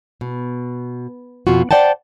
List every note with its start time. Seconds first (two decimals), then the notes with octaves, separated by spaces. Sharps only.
0.21 B2
1.47 F2 B2 F4 F#4
1.71 C5 D5 F#5 G5 A5